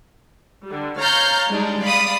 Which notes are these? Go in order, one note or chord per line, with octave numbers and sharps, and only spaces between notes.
D3 G3
C#5 F5 A#5 F6 G6 A6
G3 G#3 D4 D#4
D5 F5 B5 D#6